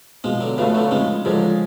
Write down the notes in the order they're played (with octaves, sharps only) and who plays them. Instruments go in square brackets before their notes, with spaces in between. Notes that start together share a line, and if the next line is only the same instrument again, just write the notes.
[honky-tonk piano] B2 [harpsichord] F3 G#3
[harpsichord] D3 F#3
[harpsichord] C#3 F3 [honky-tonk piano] A3 F4 B4
[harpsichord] D3 F#3
[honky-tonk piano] C#3 [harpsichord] F3 G#3
[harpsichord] D3 F#3 [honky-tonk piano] F3 G#3